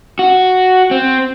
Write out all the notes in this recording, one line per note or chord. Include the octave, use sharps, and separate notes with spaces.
F#4
C4